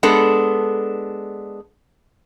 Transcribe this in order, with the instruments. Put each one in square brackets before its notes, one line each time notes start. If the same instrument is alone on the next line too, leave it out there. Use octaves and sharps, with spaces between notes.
[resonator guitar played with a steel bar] G#3 B3 D4 A4